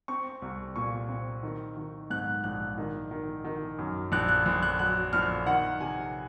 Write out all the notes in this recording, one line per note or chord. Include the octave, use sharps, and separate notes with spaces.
C4 C#6
C2
A#2 C#6
C4
D#3
D#3
G#2 F#6
A#1 F#6
D#3
D#3
D#3
F#2
A#1 F#6
F#6
A#1
F#6
F#3 F#6
A#1 F6
D#3 F#5
C3 G#5